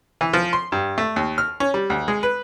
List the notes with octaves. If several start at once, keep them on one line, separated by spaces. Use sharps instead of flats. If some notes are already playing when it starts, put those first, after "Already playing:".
E3
F3
C6
G2
A3
D#2
F6
C#4
G3
D2
G#3
B4